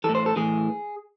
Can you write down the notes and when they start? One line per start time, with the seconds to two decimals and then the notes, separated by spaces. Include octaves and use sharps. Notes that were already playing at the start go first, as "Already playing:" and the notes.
0.04 E3 A4
0.09 A2
0.15 C5
0.26 A4
0.36 A2 E3 G#4